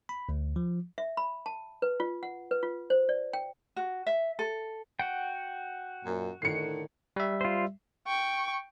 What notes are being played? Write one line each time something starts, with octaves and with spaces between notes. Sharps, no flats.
B5
D2
F3
E5
B5
A5
B4
F4
F#5
B4
F4
C5
D5
G5
F#4
E5
A4
F#4 F#5 G5
F#2 A#2
A2 D3 D#3 C7 C#7
G3 E5
F4 C5
G5 C#6